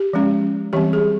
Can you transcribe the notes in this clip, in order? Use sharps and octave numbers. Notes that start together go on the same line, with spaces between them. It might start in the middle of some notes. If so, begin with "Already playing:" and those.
Already playing: G4
F3 G#3 C#4
E3 G3 C4 G4
G#4